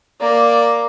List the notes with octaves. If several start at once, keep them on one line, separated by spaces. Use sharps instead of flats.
A#3 D5